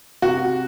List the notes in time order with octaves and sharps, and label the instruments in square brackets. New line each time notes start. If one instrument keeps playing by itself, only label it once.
[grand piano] C3 F#4